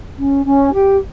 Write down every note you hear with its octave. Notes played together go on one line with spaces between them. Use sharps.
C#4
C#4
G4